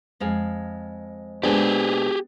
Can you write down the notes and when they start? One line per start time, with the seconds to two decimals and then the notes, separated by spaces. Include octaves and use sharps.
0.20 F2 G#3 F5
1.43 A#2 G#3 B3 D4 G4 G#4 C5